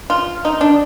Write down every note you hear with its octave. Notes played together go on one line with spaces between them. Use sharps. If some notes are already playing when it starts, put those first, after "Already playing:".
F4
D#4
D4